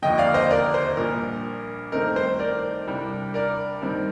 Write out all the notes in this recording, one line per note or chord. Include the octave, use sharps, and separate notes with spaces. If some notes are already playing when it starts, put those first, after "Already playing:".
F1 D#2 D3 F3 D#5 G5
D5 F5
C5 D#5
A#4 D5
C5
A#1 A#2 G3 D4 A#4
G2 D#3 A3 C4 D#4 A#4
C5
A#4 D5
C2 C3 G3 D4
A#4 D5
G2 D#3 G3 C4